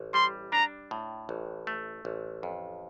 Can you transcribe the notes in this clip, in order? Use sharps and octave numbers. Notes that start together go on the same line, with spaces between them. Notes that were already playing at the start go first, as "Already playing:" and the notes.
Already playing: A1
G3 C6
D4 A#5
A2
A1
A3
A1
F2